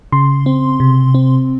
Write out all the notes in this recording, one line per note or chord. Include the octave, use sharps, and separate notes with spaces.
C#3 C6
C4
C3
C4